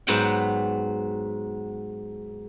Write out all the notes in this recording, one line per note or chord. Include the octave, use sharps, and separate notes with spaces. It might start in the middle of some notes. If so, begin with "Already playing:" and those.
G#2 F#3 B3 F#5 G5